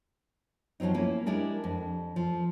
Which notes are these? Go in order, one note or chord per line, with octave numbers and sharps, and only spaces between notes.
F3 F#3 G#3 C4 D#4
A#3 C#4 E4 B4
G#3 D4 E4 G4 A#4
F2
F3